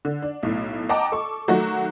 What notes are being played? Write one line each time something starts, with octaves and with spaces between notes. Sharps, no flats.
D3
D4
B1 A2
D#5 F#5 G5 A5 A#5 D6
A4 C#6
D#3 F#3 A3 F#4